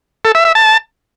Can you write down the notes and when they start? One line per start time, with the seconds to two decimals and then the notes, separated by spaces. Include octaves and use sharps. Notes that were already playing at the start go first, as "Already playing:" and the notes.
0.25 A4
0.35 E5
0.45 E5
0.55 A5